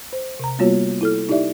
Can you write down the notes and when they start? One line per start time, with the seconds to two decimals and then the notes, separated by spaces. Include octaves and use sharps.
0.13 C5
0.40 C3 A#5
0.59 G3 A#3 B3 F4 F#4 C#5
1.01 E4 A4 F6
1.29 D#4 E4 G4 D5 E5